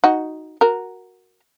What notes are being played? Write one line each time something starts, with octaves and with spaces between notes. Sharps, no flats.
D#4 F#4
F#4 A#4